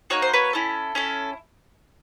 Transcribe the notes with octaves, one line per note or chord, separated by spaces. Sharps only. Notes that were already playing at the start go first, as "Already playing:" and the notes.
A#3 D#4 F#4 C#5
C5
B4 C#5
C#4 E4 A4
C#4 E4 A4